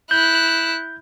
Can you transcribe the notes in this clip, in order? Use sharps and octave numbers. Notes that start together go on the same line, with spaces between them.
E4 F#6 G6